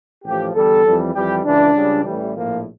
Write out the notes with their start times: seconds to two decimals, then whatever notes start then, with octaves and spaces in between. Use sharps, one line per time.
0.24 A1 A2 F3 G4
0.54 E2 D3 G3 A4
0.84 F2 E3 G3
1.14 F2 E3 G3 G4
1.44 C#2 C#3 E3 D4
1.75 C#2 C#3 G3
2.04 A1 A2 E3 G3
2.34 A#1 A2 F3 A#3